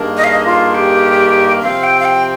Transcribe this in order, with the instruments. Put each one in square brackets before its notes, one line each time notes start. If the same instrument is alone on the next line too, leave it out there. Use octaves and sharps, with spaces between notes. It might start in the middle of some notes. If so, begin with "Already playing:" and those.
Already playing: [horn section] G2 D#3 A#3 D4 G#4
[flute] D#5
F5
D#5
F4
G4
[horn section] C3 F3 C4 [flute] F5
[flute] G5
F5
G5